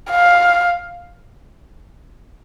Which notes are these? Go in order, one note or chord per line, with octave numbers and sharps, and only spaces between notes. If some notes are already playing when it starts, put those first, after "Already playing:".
F5